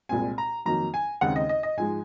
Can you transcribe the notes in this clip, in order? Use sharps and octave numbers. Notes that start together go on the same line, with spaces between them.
C2 A#2 G#3 C4 G#5
A#5
F2 D#3 F#3 A#3 D#4 A#5
G#5
D#2 C#3 G#3 C4 D#4 F#5
D#5
D#5
D#5
G#2 F3 G#3 G#5